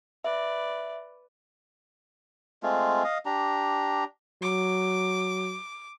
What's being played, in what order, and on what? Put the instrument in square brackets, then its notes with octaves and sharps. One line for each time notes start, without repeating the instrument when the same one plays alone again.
[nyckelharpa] B4 D5 [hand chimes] E5
[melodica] G#3 A3 C4 F4
D#5 F5
D4 G4 A#5
[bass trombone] F#3 [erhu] D6